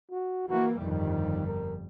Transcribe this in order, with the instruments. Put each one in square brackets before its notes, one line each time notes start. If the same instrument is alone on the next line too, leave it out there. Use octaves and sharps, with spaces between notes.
[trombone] F#4
[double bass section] E3 A#3 [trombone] F#4
[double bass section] G1 F2 G3 [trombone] D#3
[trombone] A#4